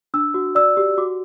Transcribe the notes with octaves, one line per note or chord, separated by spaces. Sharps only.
D4 E6
F#4
D5 E6
G4
F#4 D6